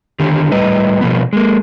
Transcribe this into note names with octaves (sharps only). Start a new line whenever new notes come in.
D3 D#3 G4
A2 G3 B4 D#5
B2 F3 A#3 B3
G#3 A#3